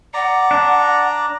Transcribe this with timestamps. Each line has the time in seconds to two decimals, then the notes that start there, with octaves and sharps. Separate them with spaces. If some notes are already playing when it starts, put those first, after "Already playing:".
0.14 D5 F#5 A#5
0.51 D4